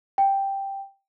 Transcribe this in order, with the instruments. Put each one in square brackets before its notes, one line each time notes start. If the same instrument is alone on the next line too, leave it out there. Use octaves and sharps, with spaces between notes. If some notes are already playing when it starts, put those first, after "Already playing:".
[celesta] G5